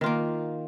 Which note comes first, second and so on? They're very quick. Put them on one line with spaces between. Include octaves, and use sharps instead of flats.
D#3 F4 A#3